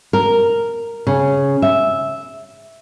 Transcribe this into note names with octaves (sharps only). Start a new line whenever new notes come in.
A#4
C#3
E5